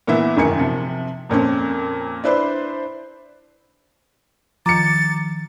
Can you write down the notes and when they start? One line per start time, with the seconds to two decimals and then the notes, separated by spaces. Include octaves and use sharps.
0.07 A#2 E3 B3 E5
0.36 E1 A1 F#2 D#3 G#5 C#7
0.59 C3 F3
1.29 F2 A#2 C4 C#4
2.24 D4 E4 B4 C5 D5
4.66 D#3 F3 A#5 D6 A6 C#7